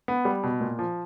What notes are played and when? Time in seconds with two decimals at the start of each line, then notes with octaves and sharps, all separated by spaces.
0.08 B3
0.25 G3
0.43 B2
0.61 A#2
0.79 F3